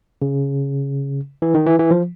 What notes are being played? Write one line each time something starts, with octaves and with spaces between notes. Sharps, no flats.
C#3
E3
D#3
E3
E3
F3